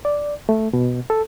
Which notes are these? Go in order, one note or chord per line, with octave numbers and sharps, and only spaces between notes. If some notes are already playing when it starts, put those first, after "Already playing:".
D5
A3
B2
A4